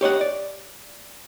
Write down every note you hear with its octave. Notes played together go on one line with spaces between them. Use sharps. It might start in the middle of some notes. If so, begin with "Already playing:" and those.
G4 C#5 D#5 F#5
D5